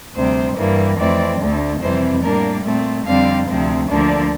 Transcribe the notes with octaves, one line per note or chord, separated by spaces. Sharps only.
D2 C3 G3 C5
G2 E3 G3 A#3
F2 E3 A3 C4 D5
D2 D3 A3
F2 C3 E3 G3 C4 C5
A2 G3 A#3 D4 A#4
A#2 A3 C4
F2 D3 G3 C4 F5
D2 C3 F3 C4
D2 D3 F3 A#3 D4